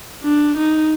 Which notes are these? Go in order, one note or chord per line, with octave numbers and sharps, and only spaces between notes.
D4
D#4